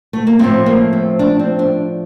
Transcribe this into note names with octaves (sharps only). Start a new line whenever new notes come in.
A3
A#3
A2 F3 A3 C4
A#3
C4
D4
C4
D4